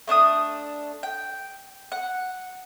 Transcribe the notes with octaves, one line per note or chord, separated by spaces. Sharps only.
A3 D4 F#5 D#6
G5
F#5